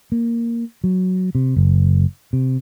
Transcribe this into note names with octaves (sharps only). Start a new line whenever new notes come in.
A#3
F#3
C3
F#1
C3